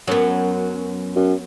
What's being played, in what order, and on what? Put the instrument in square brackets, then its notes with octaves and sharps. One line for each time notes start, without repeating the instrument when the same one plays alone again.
[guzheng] F#2 [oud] F#3 B3
[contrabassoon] F#2